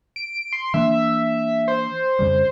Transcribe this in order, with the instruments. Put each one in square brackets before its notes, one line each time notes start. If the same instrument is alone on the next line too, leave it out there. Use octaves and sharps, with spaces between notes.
[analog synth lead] D7
C6
[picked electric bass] E3 A#3 D4 [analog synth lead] E5
[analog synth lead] C5
[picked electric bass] F2 C#3 G3